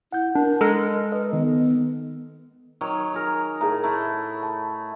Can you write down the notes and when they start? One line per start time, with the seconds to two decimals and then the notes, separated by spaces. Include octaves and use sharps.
0.12 E4 F#5 G6
0.35 D4 A#4
0.61 G#3 A4 A#5 F6
1.12 B4 D#5
1.33 D#3 B3
2.81 D#3 F#3 C#5
3.14 G#4 A#4
3.61 A2 G#4 A#4 A#5
3.83 A3 E4 A#5
4.43 A5